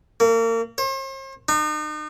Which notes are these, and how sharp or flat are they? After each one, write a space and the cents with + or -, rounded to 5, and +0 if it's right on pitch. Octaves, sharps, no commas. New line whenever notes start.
A#3 -35
C5 +45
D#4 -40